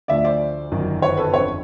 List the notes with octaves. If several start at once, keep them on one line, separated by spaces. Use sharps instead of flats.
D2 D3 F3 D5 E5
C5 D5
G1 F#2 D#3
B4 C#5
A4 B4
G1 F2 D3 B4 C#5